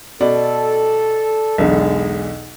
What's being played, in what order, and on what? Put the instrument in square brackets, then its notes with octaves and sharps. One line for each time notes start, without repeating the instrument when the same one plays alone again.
[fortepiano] B2 [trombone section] A4 [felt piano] D5
[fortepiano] B1 E2 D3 [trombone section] G#3